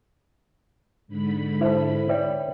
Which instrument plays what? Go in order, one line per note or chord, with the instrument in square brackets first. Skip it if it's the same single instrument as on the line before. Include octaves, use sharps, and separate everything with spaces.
[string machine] G#2 D3 B5
[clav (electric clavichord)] E4 A4 [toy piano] B4 C5
[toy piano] B4 C#5 G5 [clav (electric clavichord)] D5 E5